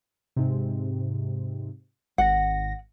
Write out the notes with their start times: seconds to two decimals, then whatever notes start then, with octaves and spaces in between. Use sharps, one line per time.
0.36 G#2 C3
2.18 G#1 F#5 A#6